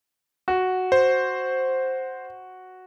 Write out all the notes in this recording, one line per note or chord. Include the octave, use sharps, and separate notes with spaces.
F#4
C5